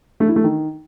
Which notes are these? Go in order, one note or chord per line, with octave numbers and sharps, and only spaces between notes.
A3
E4
A3
D#3